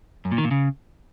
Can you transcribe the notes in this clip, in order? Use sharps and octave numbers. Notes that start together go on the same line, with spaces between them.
F#2
A#2
D#3
A#2
C#3